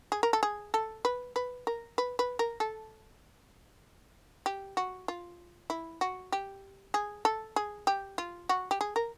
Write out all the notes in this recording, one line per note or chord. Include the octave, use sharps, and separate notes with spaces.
G#4
A#4
A4
G#4
A4
B4
B4
A#4
B4
B4
A#4
A4
G4
F#4
F4
E4
F#4
G4
G#4
A4
G#4
G4
F4
F#4
G4
G#4
A#4